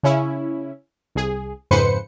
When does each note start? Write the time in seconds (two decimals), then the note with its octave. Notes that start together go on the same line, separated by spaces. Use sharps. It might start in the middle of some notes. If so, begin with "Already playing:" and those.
0.03 C#3 C#4 E4
1.15 C2 G#4
1.71 F2 G#2 C#3 B4 C5 C#7